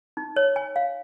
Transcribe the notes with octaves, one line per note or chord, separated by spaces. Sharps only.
D#4
C#5
G#5
F5